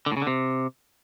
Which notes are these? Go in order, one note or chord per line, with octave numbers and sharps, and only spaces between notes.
D3
A2
C#3
D3
C3